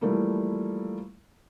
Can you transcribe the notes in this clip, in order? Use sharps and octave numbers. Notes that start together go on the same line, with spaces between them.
E3 F3 G3 A3 A#3 E4